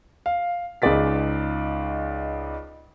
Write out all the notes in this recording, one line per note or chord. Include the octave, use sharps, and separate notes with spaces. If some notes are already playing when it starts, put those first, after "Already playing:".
F5
C#2 D#4 G#4 D5 A6 B6